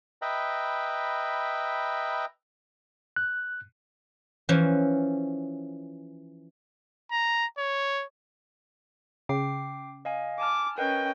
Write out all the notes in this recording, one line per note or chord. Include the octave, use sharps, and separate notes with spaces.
B4 D#5 E5 G5 A#5 B5
F#6
E3 F3 C#4
A#5
C#5
C#3 G5 D6 C7
D#5 F5 G#5
G#5 A5 D6 F6
C#4 A#4 B4 D#5 G5